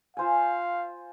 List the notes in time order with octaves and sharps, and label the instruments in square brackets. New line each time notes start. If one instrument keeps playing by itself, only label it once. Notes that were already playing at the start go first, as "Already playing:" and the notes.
[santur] F4 C5 G#5 [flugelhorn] F5